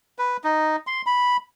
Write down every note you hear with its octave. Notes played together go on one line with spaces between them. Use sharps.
B4
D#4
C6
B5